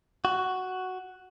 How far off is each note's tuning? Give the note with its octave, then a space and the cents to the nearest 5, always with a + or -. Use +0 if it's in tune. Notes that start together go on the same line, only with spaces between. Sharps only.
F#4 +5